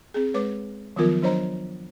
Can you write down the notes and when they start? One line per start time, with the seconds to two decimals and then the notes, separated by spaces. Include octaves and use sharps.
0.14 C4 G#4
0.34 G#3 B4 C#5 D6
0.96 D#3 F3 F#3 B3 F4 A#4
1.22 F#3 D4 C5 C#5 D#5 A#5